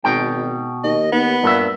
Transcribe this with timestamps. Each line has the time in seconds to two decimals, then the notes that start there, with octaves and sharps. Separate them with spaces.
0.04 G#1 B2 G5
0.84 D#2 D#5
1.12 D#2 B3
1.43 G2 A#2 E5